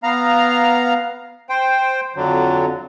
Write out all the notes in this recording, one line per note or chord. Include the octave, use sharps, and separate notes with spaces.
B3 F5 A#5
C5 G5
F2 D3 F#3